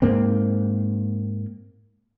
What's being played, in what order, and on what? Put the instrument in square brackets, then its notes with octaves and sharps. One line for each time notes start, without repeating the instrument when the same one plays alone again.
[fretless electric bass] G#2 A#3 C4